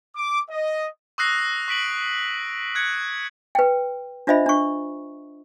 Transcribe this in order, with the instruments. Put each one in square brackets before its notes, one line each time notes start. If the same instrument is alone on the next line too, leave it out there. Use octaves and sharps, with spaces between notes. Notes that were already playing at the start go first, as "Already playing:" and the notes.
[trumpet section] D6
D#5
[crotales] C#6 D#6 E6 F#6 A#6 C7
C#6 B6 D7 F#7
F#6 G#6 C#7
[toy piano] B4 G5
D4 F4 C5 D#5 E5 B5
D4 C#6